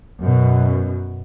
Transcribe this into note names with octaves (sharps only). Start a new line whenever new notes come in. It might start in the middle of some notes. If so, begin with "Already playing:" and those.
F#2 B2